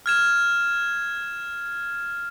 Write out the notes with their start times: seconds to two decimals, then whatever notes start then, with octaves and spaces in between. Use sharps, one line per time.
0.06 F6 G#6 E7